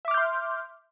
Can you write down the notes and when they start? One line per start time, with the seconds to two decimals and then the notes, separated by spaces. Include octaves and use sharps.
0.05 E5
0.08 D6
0.11 F6
0.14 G6
0.17 C6